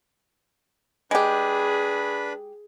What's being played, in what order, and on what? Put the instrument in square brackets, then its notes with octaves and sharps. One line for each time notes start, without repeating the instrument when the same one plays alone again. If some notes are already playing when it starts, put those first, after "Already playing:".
[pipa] G#3 G4 [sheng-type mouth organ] D4 B4 B5 [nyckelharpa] G#4